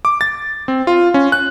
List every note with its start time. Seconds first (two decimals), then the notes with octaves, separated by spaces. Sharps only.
0.05 D6
0.21 A6
0.68 C4
0.87 F4
1.14 C#4
1.32 F#6